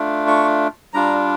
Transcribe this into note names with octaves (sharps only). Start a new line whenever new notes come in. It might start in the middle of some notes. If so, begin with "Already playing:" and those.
Already playing: A3 D4 F4
C#6
G3 D4 F4 A#5